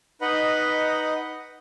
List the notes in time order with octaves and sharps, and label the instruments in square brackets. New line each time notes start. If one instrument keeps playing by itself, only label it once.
[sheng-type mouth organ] D#4 B4 D#5 F#5 B5